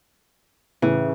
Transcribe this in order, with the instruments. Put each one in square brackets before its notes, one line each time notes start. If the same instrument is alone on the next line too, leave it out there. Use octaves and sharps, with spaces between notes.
[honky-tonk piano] A2 C#3 [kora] E3